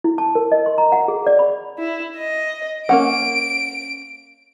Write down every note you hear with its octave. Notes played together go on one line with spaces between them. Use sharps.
E4
A5
A#4
D#5
C6
A#5
F#5
G#4
D5
B5
E4
D#5
A#3 C#4 F#5 D7